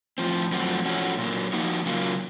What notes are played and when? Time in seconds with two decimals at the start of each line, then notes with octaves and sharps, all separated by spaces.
0.18 A2 F3 C4
0.52 F#2 F3 A3 C4 F#4
0.85 A2 F3 A3 C#4 F#4
1.18 A#2 F#3 A#3
1.53 F3 A#3 D#4 F#4
1.86 C#3 F#3 A#3 F4